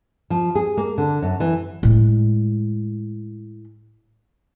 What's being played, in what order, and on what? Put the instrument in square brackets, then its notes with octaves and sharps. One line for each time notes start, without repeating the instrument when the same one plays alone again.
[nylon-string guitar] F3
G#4
A#3
D3
F#2
E3
[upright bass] A2 G#3